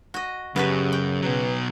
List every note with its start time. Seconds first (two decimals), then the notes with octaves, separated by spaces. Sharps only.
0.14 F#4 D#5
0.56 F#2 C#3 B3 F#4 G4 B4
0.93 G5
1.22 B2 F#3 B4